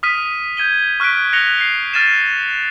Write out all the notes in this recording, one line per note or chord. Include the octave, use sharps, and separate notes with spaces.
D#6 F6 B6 D#7
G6 G#6 D#7 G7
C#6 F6 F#6 B6 D7
F#6 A#6 C#7 F7 G7
C7
F6 A6 D#7 E7